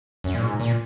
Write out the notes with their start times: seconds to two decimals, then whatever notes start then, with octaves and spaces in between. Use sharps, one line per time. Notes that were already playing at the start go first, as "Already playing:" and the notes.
0.24 F#2
0.34 A#2
0.41 G#2
0.59 A#2